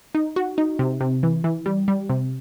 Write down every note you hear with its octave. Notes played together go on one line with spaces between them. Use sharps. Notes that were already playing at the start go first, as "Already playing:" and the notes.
D#4
F#4
D#4
C3
C3
E3
E3
G3
G3
C3